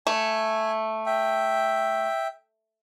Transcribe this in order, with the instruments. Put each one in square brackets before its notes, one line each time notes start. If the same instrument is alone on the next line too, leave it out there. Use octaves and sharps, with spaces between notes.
[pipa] A3 [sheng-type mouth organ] G#5
[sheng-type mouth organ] E5 G5